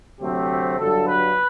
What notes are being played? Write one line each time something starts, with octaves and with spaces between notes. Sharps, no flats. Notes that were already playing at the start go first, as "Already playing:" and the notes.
D2 C3 F#3 A3 C4 G4
G1 G2 F#3 A4
B4